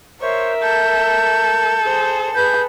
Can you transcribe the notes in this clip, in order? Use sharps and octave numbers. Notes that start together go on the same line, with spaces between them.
A#4 C5 C#5 E5
A4 G6
G#4 C5
G#4 B4 G6